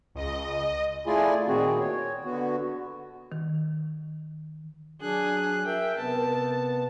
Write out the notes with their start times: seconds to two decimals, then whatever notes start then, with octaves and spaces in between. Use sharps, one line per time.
0.15 C#2 D#5
1.06 A3 E4 F4 G#4 D5 G#5
1.48 A#2 D#3 C4 F#4 G#4
1.79 C#5
2.25 D3 B3 F#4
3.32 D#3
5.01 F#3 D4 G#4 F#6
5.65 A#4 E5 G5
5.97 C3 B3 A5